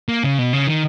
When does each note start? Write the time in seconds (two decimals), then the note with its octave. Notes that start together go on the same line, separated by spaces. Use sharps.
0.09 A#3
0.24 C#3
0.38 B2
0.53 C#3
0.67 D#3